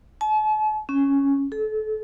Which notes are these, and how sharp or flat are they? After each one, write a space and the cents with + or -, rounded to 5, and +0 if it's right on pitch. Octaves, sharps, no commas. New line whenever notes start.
A5 -45
C#4 +0
A4 -30